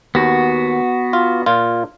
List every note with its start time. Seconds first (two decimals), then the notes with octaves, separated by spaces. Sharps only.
0.15 D#2 B3 F#4
1.13 F4
1.46 A#2 F4